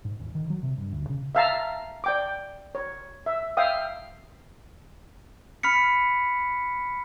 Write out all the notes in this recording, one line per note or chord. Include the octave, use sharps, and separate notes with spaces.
G#2
D#1
D#3
F#3
C3
G2
D2
C#3
E5 F5 A5 A#5
D5 G5 D6
C#5
E5
E5 F5 G5 D#6
B5 F6 B6 C#7